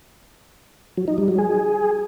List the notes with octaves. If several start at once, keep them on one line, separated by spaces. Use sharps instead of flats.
F#3
D#4
G3
F#3
G#4